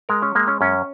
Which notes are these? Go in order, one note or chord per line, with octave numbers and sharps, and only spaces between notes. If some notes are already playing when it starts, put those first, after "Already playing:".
G#3 A#4
C#4
G#3 A#3
C#4
F#2 C#4